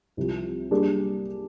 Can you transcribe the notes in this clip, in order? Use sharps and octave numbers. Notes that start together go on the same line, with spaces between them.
C2 C3 F3
G3 A#3 D4 G#4